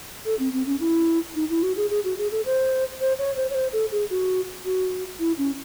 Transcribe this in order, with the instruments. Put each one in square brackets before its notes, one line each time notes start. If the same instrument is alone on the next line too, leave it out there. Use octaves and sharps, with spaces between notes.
[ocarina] A4
C4
C4
C#4
E4
D#4
E4
F#4
G#4
G#4
F#4
G#4
A4
C5
C5
C#5
C5
C#5
C5
A4
G#4
F#4
F#4
E4
C#4